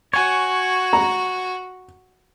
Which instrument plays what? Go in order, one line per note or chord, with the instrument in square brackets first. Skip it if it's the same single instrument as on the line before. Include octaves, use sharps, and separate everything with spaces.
[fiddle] F#4 [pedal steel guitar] C#5 G#5
[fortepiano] A#5